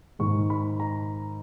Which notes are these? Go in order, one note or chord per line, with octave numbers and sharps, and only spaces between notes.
G#2 D#3 G#3 C#6
B5
A#5